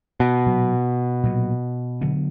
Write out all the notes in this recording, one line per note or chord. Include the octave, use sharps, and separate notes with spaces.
B2
A#2 F#3 B3
A#2 F#3 B3
D3 F#3 B3